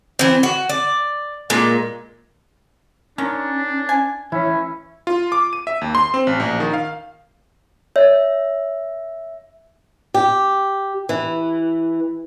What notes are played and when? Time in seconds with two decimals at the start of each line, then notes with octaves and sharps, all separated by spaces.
0.19 E3 C4
0.43 F#4
0.69 D5
1.50 A#2 G#3
3.18 D#3 C#4 D4
3.89 G#5
4.32 E3 C#4 E4
5.07 F4
5.32 D6
5.53 D#7
5.67 E5
5.81 D#2
5.95 C6
6.14 C4
6.27 A1
6.40 A#1
6.60 D#3
6.73 F5
7.96 C#5 E5
10.14 G4
11.09 E3